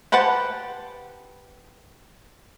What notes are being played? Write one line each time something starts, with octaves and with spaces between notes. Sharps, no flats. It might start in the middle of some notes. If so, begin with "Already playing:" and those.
G4 B4 C5 F#5 A5